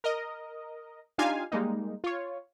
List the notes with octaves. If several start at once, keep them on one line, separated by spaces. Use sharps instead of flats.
A#4 D#5
D4 D#4 F4 G4 F5 G#5
G3 G#3 A#3 D#4
F4 C#5